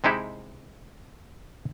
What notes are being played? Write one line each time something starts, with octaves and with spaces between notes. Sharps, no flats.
C3 G#3 D#4 E4 G4